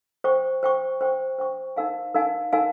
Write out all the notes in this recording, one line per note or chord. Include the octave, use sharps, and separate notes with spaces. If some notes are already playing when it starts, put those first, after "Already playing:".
C5 G5 C#6
C5 G5 C#6
C5 G5 C#6
C5 G5 C#6
D#4 A#4 F5 G#5
D#4 A#4 F5 G#5
D#4 A#4 F5 G#5